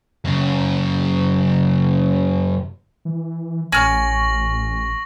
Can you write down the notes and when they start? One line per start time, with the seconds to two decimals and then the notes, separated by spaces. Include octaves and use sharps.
0.25 F#2 C#3
3.05 E3
3.72 A1 C#4 C#6 F6 A#6 F#7